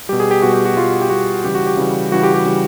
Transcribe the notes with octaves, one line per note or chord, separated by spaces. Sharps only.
B2 G3 G4
G#4
G4
B2 G3 F#4
G4
F#4
B2 G3 F4
G4
B2 G3 F#4
C#3 E3 G3 G4
F#4
G4
C#3 E3 G3
C#3 E3 G3 F#4
G4
G4
C#3 E3 G3